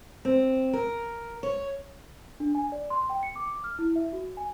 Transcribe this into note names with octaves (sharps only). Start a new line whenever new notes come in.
C4
A#4
C#5
D4
G#5
D5
C6
G5
C#7
D6
F6
E4
E5
F#4
G#5